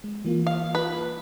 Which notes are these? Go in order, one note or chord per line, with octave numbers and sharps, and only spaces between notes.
G#3
E3 A#3 F4
F5
B4